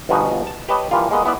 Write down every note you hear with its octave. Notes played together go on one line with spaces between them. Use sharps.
G1 B2 F3 D#4 F#4 G#5
A5
G4 B4 C#5 D#5 A5
E3 F3 G3 A#3 F4
G#3 A#3 B3 D#5
B3 E4 D5